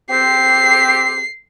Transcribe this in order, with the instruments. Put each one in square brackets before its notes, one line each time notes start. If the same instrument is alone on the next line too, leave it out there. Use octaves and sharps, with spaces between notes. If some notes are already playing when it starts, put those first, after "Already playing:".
[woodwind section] C4 G4 [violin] C7